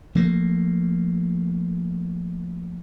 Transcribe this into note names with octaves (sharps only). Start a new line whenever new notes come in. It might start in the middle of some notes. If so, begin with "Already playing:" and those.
F3 A3 A#3